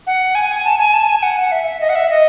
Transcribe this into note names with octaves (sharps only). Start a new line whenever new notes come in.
F#5
G#5
G#5
A5
G#5
A5
G#5
F#5
F#5
E5
D#5
F#5
E5
D#5